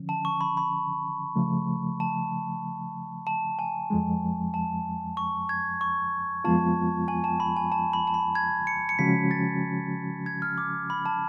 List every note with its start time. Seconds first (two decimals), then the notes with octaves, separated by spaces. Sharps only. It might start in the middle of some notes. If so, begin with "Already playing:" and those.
Already playing: D3 F3 C#4
0.09 A5
0.25 C#6
0.41 B5
0.57 B5
1.36 C#3 F3 A3
2.00 A5
3.27 A5
3.59 G#5
3.90 F2 F3 G#3
4.54 A5
5.17 C#6
5.49 G#6
5.81 C#6
6.44 F2 F3 G#3 B3 F4 A5
7.08 G#5
7.24 A5
7.40 B5
7.57 G#5
7.72 A5
7.93 B5
8.07 A5
8.14 B5
8.35 G#6
8.67 C#7
8.89 C#7
8.99 C#3 F3 G#3 C#4 F#4 B6
9.31 A6
10.26 G#6
10.42 F6
10.58 D6
10.90 B5
11.06 A5